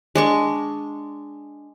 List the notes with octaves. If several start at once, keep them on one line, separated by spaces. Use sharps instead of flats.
G#3 D4 C#6